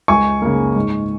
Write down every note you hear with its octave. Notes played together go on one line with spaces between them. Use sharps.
C#2 G#5 C#6
C#3 A#3
G#2